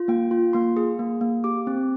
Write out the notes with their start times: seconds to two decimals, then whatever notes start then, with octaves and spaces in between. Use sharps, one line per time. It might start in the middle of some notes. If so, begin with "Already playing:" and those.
Already playing: F4
0.08 A#3 G5
0.31 F4
0.53 A#3 C6
0.77 G#4
0.99 A#3
1.21 A#3
1.44 G4 D6
1.67 C4